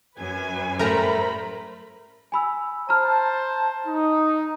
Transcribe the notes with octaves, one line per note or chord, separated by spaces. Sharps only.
F#2 B4 G#5
A2 G3 A3 A#4 C5 A#5 B5
G#5 B5 E6
C5 A5 A#5 F6
D#4